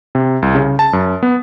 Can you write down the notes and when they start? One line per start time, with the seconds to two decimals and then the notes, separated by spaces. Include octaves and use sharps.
0.15 C3
0.42 C2
0.55 C#3
0.79 A5
0.93 F#2
1.23 B3